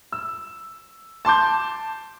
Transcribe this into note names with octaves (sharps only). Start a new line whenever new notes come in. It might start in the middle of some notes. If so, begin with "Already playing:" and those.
E6
A5 C6 D6 G6